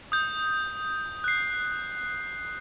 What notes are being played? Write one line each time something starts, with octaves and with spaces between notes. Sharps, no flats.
D#6 G6
F#6 C7